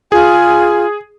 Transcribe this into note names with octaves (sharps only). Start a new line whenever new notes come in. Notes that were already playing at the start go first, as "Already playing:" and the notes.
F4 G#4 G#5